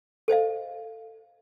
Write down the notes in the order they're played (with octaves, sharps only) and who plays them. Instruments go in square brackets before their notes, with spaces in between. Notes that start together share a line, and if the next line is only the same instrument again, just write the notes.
[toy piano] A4 C5 D#5 F5